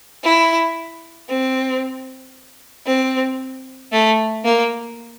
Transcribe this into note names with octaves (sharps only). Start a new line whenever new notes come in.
E4
C4
C4
A3
A#3